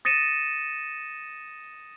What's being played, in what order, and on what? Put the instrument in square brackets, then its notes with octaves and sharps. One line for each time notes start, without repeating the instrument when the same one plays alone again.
[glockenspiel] D#6 A6 A#6 C#7 D#7 E7